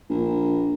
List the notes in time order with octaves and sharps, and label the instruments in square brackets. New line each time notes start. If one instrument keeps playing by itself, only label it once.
[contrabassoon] A#1